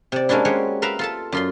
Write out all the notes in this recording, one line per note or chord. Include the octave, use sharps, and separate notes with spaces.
C3 D5
G#3 A#3 C#4 D4 E4
G#3 F#4 G4 C5 C#5
A#4 B4 E5 F5 A#5
F4 A4 A5
F#2 F4 C6